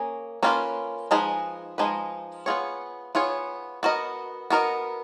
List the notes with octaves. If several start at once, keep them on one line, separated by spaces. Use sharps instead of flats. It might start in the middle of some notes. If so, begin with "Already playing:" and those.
Already playing: A#3 C#4 G#4
A#3 C#4 F4 G#4 B4
F3 G#3 D#4 G#4 B4
F3 G#3 D#4 G#4 B4
B3 F4 G#4 C#5
B3 F4 G#4 C#5
B3 F#4 A#4 D#5
B3 F#4 A#4 D#5